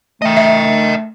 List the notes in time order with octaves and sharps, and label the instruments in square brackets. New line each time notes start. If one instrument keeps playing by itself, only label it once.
[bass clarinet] A3 [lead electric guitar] D#5 G5
[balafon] E5